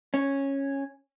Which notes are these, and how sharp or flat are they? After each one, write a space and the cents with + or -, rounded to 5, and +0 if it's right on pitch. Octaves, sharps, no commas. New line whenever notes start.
C#4 -10